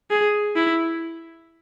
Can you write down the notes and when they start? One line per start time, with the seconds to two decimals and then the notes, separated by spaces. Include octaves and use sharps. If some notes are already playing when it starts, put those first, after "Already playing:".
0.10 G#4
0.56 E4